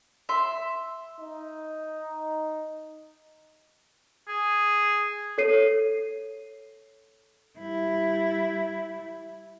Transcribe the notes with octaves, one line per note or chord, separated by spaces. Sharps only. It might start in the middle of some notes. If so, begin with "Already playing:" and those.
E5 C6
D#4
G#4
A4 C#5 C7 D#7
G3 E4